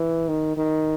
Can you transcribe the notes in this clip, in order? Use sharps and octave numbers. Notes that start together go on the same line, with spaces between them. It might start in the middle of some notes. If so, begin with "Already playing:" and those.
Already playing: E3
D#3
D#3